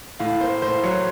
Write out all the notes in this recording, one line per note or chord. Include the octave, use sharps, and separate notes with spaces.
A2 F5
A#3 C5
A2 C5
F#3 C#5